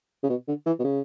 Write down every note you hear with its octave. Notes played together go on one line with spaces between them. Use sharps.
C#3
B2
D3
E3
B2
C#3